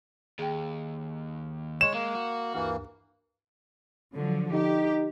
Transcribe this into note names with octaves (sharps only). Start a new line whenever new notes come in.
D#2 G#4 G5
G#3 C#5 E7
G#3 A#3
F#4
D2 G2 E3 A#3 A#4
D3 F3 F#3
D#4 G4